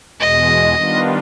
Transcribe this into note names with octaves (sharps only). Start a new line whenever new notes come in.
E2 B2 G#3 D#5
D#3 G3 B3 D4 F4